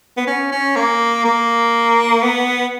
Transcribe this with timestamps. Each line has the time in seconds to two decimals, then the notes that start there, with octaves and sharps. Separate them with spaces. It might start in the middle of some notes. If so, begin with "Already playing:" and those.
0.17 B3
0.27 C#4
0.52 C#4
0.76 A#3
1.25 A#3
2.23 B3